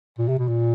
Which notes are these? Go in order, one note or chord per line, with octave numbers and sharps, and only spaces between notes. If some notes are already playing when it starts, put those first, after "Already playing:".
A#2
C3
B2
A#2